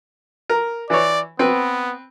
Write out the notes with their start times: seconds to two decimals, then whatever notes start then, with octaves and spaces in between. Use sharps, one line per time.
0.50 A#4
0.90 E3 C#5 D5
1.39 B3 C4 B4